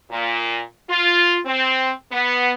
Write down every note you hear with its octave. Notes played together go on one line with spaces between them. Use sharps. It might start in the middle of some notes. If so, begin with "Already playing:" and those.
A#2
F4
C4
B3